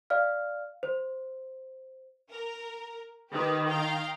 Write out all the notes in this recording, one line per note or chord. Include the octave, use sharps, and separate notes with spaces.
D5 F5 F6
C5
A#4
D#3 G4 B4
F5 G5 A#5